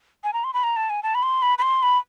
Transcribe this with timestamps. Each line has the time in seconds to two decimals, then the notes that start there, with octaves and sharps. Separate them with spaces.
0.24 G#5
0.33 A#5
0.44 C6
0.54 B5
0.63 A#5
0.76 A5
0.90 G#5
1.03 A5
1.15 B5
1.23 C6
1.42 B5
1.58 B5
1.62 C6
1.83 B5